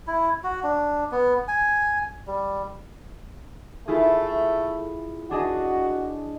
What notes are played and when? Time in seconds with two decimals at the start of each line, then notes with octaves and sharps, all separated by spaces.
0.07 E4
0.44 F#4
0.63 D4
1.12 B3
1.48 G#5
2.27 G3
3.88 A3 E4 F4 G#4
5.31 D4 F#4 G#4 D#5